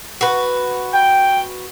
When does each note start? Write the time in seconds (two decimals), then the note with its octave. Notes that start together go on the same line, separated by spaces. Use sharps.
0.21 F#4 B4
0.93 G5